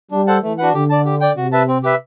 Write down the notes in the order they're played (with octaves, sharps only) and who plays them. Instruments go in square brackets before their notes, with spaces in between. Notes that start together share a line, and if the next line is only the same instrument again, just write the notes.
[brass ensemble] G3 [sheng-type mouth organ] D4
[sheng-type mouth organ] A4 C5 F#5 A5
[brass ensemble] E3 [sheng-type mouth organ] A3
[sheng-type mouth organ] D4 F#4 B4 F#5
[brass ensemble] D3 [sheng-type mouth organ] G4
[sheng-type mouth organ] D5 A5
G4
D5 G5
[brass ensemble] C3 [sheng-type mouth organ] F#4
[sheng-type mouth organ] B4 E5 A5
C4
G4 B4 E5